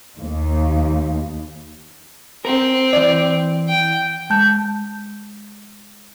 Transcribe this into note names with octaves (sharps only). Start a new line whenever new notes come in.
D#2
C4 A#4
E3 D5
G5
G#3 A5 G6